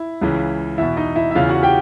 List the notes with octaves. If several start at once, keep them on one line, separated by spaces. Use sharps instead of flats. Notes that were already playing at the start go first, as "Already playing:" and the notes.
Already playing: E4
C#2 C#3 E3
E2 B2 E4 E5
D#4 D#5
E4 E5
E5
E2 C#3 E3 F4 F5
F#4 F#5
G4 G5